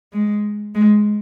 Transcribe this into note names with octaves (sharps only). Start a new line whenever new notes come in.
G#3
G#3